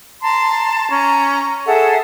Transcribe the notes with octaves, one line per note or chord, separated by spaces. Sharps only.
A5 A#5 C6
C#4 A#5
G#4 A4 E5 F#5